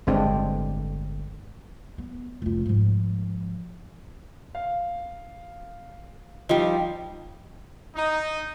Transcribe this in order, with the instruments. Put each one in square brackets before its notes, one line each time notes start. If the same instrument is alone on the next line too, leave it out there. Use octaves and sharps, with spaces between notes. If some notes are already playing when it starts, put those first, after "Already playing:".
[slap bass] G1 A2 [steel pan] G#3 C4 D4
[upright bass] B3
F1 F4
G#2 F3
[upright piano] F5
[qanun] F3 G3 [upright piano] D#4
[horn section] D#4